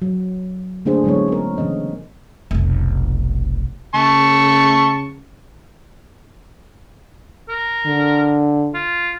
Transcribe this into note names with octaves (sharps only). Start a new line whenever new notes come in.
F#3
D3 A3 A#3 D4 G#4 C5
D3 F#3 G#3 B3 E4 C#5
C#4 A#4
C#3 E3 C4 D#5
F1 B1
C#3 A5 C#6
A#4
D3
F4